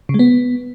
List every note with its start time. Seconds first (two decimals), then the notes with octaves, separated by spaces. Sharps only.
0.09 C#3
0.14 G#3
0.19 B3